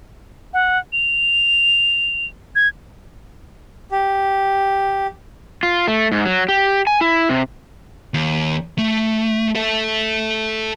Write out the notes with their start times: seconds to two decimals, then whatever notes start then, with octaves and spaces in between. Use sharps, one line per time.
0.54 F#5
0.93 F7
2.56 G#6
3.91 G4
5.63 F4
5.88 A3
6.12 G#2
6.25 F#3
6.49 G4
6.87 G#5
7.01 E4
7.29 C3
8.14 D#2
8.78 A3
9.55 A4 E5